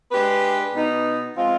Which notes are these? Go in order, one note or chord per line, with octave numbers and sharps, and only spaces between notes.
G#3 D4 G4 B4
B2 B3 D#4
F3 G#3 C4 F4